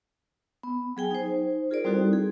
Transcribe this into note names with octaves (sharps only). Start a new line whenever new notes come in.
B3
F#3 G#4 G5 G#5
D#4 C5
F4 G#4 A#4 C5 D5
G3 C4 D#4 E4 F#4 A4
G#4